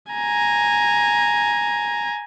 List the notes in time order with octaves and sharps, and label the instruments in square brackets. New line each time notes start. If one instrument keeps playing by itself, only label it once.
[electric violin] G#5 A#5